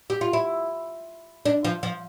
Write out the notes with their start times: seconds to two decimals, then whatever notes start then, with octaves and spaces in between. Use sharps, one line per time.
0.10 G4
0.21 F4
0.33 E4
1.45 D4
1.65 F3
1.83 F3